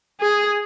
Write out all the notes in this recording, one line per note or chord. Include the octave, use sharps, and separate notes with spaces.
G#4